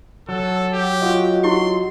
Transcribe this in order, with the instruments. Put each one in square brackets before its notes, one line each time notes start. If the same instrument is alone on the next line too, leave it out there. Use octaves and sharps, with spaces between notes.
[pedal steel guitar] F#3 [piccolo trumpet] A4
[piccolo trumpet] G4
[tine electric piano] F4 F#4 D#5
[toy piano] E4 G4 [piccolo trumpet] C6